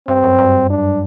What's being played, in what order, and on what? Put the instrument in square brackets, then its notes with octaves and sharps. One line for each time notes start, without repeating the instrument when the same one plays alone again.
[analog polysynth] G2 [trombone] C4
[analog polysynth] F#2
G2
[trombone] D4